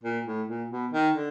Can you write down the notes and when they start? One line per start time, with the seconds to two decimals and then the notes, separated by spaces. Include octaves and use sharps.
0.04 A#2
0.26 A2
0.48 A#2
0.71 B2
0.93 D#3
1.15 D3